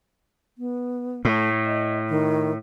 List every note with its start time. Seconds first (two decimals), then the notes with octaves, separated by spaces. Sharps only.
0.58 B3
1.25 A2 A3
1.66 D#5
2.10 D#3